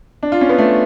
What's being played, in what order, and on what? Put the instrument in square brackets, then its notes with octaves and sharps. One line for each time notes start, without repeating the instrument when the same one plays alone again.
[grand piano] D4
F4
C#4
B3
A3